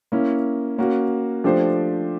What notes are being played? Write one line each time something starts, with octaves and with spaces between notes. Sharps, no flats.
A#3 C#4 E4
A#3 C#4 F#4
F3 A3 D4 G4 C5